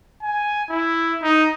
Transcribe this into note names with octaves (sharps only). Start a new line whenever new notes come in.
G#5
E4
D#4